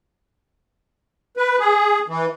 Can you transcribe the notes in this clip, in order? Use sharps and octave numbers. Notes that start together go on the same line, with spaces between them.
B4
G#4
E3